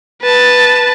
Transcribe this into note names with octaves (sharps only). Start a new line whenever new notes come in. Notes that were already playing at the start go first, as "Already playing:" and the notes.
B4 A5